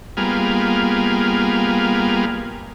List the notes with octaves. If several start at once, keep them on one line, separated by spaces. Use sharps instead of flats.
G3 A#3 B3 F4 G#4